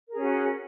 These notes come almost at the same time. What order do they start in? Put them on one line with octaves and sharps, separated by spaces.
A#4 G#4 C#4 F#4